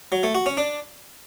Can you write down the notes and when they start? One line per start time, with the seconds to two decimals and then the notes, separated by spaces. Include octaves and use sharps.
0.12 F#3
0.23 A3
0.35 F#4
0.46 C#4
0.57 D4